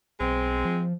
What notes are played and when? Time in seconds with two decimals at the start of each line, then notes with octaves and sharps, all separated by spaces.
0.20 B1 G#3 C4
0.65 F3